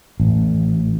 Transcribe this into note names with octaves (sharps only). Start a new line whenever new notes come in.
A1